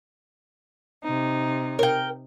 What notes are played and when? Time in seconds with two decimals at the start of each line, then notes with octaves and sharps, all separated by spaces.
1.03 C3 D#4
1.79 A#4 G5